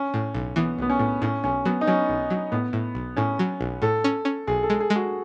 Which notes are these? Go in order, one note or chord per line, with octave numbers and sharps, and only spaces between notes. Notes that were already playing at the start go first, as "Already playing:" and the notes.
Already playing: C#4
A2
B1
E3 B3
B1 B3
C#4
A2
A2 C#4
B1 C#4
F#3 B3
D#4
F#3 C#4
B1
F#3
A2 B3
A2
B1
A2 C#4
F#3
B1
A2 A4
C#4
C#4
B1 G#4
A4
G#3
G#4
G#3
F#4